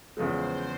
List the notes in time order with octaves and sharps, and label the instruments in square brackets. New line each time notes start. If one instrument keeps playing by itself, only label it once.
[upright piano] E2 C#3 F3 G#3 [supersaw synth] C5